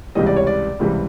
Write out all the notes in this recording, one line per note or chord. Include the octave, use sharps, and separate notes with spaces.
C#2 C3 E3 G3 D#5
D5
C#5
D5
C#2 C3 E3 G3